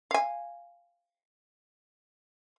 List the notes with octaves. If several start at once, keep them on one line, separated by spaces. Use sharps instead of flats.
F5 G#5